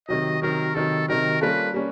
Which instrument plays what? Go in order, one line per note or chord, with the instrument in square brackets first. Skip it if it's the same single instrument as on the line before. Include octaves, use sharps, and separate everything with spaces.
[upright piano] C3 D#3 F#3 [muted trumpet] D#5
[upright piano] C3 D#3 F#3 [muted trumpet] A#4
[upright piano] C3 D#3 F#3 [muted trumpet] A4
[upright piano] C3 D#3 F#3 [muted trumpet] A#4
[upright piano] G3 A#3 C#4 F4 A4 [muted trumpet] B4
[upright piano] G3 A#3 C#4